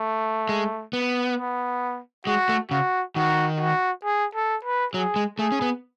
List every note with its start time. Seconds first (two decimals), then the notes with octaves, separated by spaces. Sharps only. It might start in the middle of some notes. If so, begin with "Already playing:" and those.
Already playing: A3
0.49 G#3
0.93 B3
1.38 B3
2.27 G#3 F#4
2.49 A3
2.71 C#3 F#4
3.16 D#3 F#4
3.60 F#4
4.05 G#4
4.35 A4
4.65 B4
4.94 F#3 G#4
5.16 G#3
5.39 A3 G#4
5.52 C#4
5.62 B3